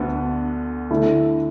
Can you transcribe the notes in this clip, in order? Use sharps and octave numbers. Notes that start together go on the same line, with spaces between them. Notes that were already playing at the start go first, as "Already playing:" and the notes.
Already playing: D2 D3 B3
D3 A3 E4